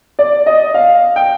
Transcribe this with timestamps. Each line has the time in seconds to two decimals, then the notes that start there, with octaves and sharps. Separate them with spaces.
0.19 D5
0.46 D#5
0.74 F5
1.16 G5